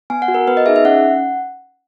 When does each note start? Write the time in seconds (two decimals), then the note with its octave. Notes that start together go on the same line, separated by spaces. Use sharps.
0.10 B3 G#5
0.22 F#5
0.28 F#4
0.34 A#4
0.47 B3 B4
0.57 D#5
0.66 D#4 G#4 E5
0.76 E5
0.85 C#4 F#5